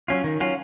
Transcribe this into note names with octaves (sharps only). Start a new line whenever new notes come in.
F#3 C#4 F4
D#3
F#3 C#4 F4